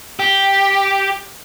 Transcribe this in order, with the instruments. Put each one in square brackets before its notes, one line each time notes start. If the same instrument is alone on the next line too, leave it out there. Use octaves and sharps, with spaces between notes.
[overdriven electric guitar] G4